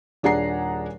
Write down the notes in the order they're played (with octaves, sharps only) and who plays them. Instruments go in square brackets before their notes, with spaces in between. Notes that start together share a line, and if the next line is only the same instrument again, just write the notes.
[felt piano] D#1 D4 G#4 F#5 A#5 C7